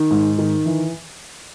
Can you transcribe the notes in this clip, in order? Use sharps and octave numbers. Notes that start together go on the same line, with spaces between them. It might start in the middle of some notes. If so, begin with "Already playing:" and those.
Already playing: D#3
G#2
D#3
E3